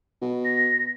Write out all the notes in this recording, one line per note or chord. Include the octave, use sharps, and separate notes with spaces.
B2
A#6